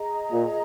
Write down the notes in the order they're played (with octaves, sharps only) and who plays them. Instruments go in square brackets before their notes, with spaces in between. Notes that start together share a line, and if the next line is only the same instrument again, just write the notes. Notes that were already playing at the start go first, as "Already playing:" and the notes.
Already playing: [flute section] G#4 D#5 A#5
[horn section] A#2